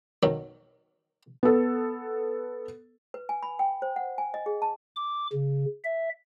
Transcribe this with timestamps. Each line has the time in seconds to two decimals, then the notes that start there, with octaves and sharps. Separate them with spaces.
0.23 B2 D#3 F#3
1.43 B3 A4
3.14 B4
3.29 G#5
3.43 B5
3.59 G5
3.82 C5
3.96 F#5
4.18 G#5
4.34 D#5
4.46 G#4
4.62 A5
4.96 D6
5.32 C#3
5.84 E5